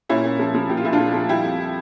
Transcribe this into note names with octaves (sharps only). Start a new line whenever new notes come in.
A#2 C#4 E4
A#2
F3
F3
A#2 G4
F4
A#2 E4
D4 F4
F3
F3
G3 E4 G4
F2